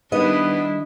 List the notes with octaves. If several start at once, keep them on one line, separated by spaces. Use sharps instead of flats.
D#3 G3 B3 D4 E4 D#5